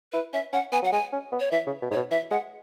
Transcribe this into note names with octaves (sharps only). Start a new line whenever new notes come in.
E4 B4
C#4 E5
C#4 F#5
B3 G#5
F#3 F#5
G#3 G#5
C#4
B3
C#5
E3 E5
C#3
B2
G#2 C#5
B2
E3 E5
G#3 F#5